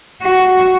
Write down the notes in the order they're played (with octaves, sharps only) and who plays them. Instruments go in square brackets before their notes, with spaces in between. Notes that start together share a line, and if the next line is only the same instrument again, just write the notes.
[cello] F#4